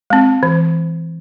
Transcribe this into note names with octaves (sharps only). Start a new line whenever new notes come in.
G#3 C4
E3